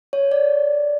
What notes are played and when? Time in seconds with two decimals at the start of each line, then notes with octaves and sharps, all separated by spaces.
0.13 C#5
0.31 D5